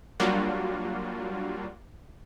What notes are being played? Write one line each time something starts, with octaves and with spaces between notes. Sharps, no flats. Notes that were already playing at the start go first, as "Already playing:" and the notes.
F#3 G3 A#3 D4 F4 F#4